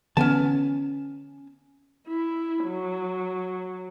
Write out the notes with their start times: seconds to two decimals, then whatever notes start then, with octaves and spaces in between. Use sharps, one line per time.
0.17 D3 E3 B3 C#4 G#5 A5
2.08 E4
2.65 F#3